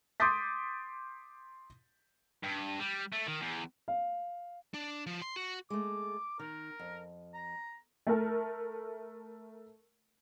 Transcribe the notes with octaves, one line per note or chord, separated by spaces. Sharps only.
C6 D6 D#6 G6 A6 B6
G2
G3
A3
D#3
E2
F5
D4
F3
C6
F#4
G#3 A3 D6
D#3 A#4
F2
A#5
A3 A#4 A5